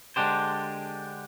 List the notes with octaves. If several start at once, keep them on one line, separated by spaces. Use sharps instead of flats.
D3 G#3 D4 G4 C5